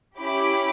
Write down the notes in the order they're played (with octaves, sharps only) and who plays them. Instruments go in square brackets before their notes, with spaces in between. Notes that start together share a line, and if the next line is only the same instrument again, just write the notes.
[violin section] C#4 E4 G4 B5 D6